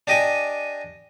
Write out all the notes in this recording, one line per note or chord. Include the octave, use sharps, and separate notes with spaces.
D4 G4 D#5 G5 G#5